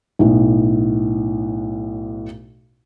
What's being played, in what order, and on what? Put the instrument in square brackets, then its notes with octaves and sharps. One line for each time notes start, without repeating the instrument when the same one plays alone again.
[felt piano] B1 A2